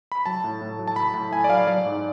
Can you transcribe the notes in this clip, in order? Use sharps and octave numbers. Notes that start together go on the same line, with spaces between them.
B5
F#3 A5
A2
A2
F#3
A5
F#3 B5
A2 A5
A2 G#5
D5
F#3 F5
F#3 D5
G#2